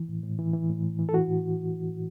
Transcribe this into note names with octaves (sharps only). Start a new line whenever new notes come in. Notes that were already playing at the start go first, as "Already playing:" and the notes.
Already playing: E3
A2
A2
E3
E3
A2
A2
E3
A4
E3 F#4
A2
A2
E3
E3
A2